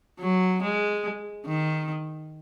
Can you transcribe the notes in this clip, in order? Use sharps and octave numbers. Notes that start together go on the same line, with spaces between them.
F#3
G#3
D#3